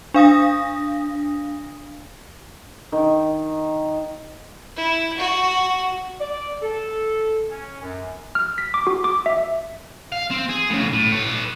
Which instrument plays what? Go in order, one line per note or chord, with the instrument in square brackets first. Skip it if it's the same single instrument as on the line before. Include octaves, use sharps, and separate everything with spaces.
[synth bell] D4 F5 D#6 A#6
[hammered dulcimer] D#3
[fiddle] E4
F#4
[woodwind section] D5
A4
C#4
F#2
[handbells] F6
B6
D6
F#4
D6
E5
[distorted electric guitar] F5
C4
G#4
A2 C#3
A2
B4 C#5